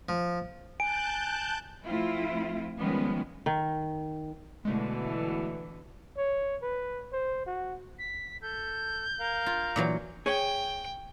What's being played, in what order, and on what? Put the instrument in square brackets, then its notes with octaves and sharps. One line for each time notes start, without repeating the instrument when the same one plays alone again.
[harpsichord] F3
[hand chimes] G#5 [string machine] A5 F#6 G6 [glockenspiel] D7
[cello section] F3 A3 C4 E4 F4
D#3 F3 G3 G#3 B3 C#4
[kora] D#3
[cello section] B2 D3 E3 [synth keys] G#3 A3
[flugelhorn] C#5
B4
C5
F#4
[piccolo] B6
[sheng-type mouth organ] A4 [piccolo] G6
[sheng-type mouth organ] A#4 F5
[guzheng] F4
A#2 E3 F#3
[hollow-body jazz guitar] G#4 C#5 [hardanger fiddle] G5